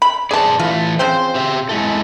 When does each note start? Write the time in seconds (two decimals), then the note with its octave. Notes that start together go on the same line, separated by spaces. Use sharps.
0.02 B5
0.31 G#4 B4 C5 D5 A5
0.59 E3 A3 F4
0.99 C#3 F3 C4 C5
1.35 G4 E5
1.69 G#3 E4 A4